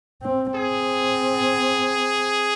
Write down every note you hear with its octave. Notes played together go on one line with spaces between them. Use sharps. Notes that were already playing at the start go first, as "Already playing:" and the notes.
C4
C4 G#4